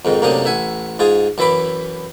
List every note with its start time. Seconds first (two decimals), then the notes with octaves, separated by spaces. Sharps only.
0.05 F2 G#2 D#3
0.22 F#2 A2 C3 A#3 D4 D#6
0.45 A1 E5 F#5 G#5
0.99 G#2 F4 G#4 D#6
1.38 F#2 E3 E5 B5 D6